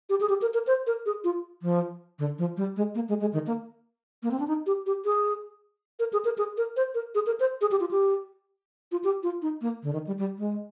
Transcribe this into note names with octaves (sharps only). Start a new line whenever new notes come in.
G4
G#4
G4
A#4
A#4
C5
A#4
G#4
F4
F3
D3
F3
G3
G#3
A#3
G#3
G#3
D#3
A#3
A#3
C4
D4
D#4
G4
G4
G#4
A#4
G#4
A#4
G#4
A#4
C5
A#4
G#4
A#4
C5
G#4
G4
F4
G4
F4
G4
F4
D#4
A#3
D3
D#3
G3
G3
G#3